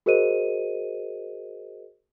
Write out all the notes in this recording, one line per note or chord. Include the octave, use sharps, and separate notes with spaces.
F#4 G#4 A#4 C5 D#5 D#7